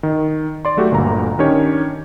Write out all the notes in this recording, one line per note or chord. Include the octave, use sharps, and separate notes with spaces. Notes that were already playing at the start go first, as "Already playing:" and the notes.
D#3
D5 C6
F#3 A3 F#4 G4
G1 D2 A#2 A#5
D#3 C#4 D4 G4 C#5